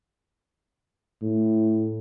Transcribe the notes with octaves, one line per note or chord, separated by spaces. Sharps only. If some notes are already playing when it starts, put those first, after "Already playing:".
A2